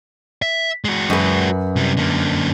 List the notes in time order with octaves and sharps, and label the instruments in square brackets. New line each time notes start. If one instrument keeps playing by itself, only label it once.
[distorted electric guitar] E5
G#3 F#4
[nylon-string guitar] F#2 B4
[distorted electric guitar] C3 G3
D3 A#3